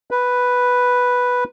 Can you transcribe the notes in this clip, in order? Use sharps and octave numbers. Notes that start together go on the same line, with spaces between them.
B4